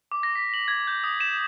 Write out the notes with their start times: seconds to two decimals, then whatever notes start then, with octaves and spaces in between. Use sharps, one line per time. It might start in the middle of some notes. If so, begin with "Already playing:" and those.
0.12 D6
0.23 A#6
0.35 B6
0.54 F#7
0.68 G#6
0.88 G6
1.04 D#6
1.20 E7